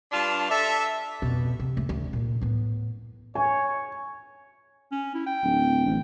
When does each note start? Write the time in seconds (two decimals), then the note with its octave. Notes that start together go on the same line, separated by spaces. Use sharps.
0.12 G2 D4 F4 A5
0.50 A4 D5 E5
1.22 F2 B2
1.60 C3
1.77 C#2 A3
1.89 D2
2.13 A#2
2.41 A2 B3
3.35 C#5 G#5
4.92 C#4
5.14 E4
5.26 G5
5.44 D1
5.86 A1